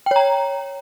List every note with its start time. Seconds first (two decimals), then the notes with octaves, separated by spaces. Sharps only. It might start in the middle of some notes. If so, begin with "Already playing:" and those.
0.06 G5
0.11 C#5
0.16 A#5